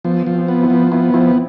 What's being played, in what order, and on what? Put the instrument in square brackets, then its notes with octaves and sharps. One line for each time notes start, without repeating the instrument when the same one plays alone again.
[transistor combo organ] F3 [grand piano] B3
[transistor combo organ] F3
[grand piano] C4
[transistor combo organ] B3
[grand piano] C4 E4
[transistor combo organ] F3
[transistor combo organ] B3 [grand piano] C4 E4
[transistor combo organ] F3 [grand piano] C4 E4